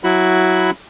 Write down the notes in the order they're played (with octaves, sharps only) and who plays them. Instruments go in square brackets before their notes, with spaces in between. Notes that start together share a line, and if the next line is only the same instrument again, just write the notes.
[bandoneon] F#3 E4 F#4 B5